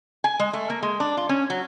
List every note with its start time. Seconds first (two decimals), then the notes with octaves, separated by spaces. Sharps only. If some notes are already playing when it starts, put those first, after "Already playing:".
0.24 G#5
0.39 G#3
0.53 A3
0.70 A#3
0.83 G#3
1.00 D4
1.17 F4
1.29 C#4
1.50 F#3